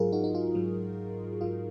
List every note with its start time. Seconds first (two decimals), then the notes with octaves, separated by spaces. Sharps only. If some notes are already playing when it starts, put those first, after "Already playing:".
Already playing: G#2 F#3 F4 G#4 A#4
0.12 D#4 F#4
0.24 D#4
0.35 F4
0.55 G#2 F#3
1.41 G#2 F#3 F4